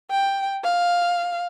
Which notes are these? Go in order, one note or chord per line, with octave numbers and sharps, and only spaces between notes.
G5
F5